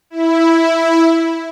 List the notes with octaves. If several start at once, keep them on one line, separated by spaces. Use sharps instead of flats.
E4